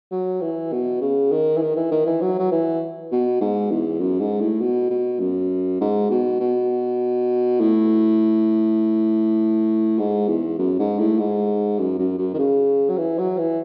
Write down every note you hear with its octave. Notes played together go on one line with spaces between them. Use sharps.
F#3
E3
B2
C#3
D#3
E3
D#3
E3
D#3
E3
F#3
F#3
E3
B2
G#2
E2
F#2
G#2
A2
B2
B2
F#2
G#2
B2
B2
A2
G#2
E2
F#2
G#2
A2
G#2
F#2
F#2
F#2
D#3
C#3
F#3
E3
F#3
E3